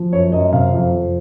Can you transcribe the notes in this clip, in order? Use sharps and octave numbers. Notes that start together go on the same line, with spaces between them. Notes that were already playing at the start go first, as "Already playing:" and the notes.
Already playing: F3
F#2 C#5
F#2 D#5
C3 F5
F2
F2